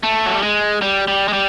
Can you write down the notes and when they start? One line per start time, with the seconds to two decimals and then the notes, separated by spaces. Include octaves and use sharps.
0.03 A3
0.26 F#3
0.34 G3
0.43 G#3
0.82 G3
1.08 G3
1.28 G#3
1.33 G3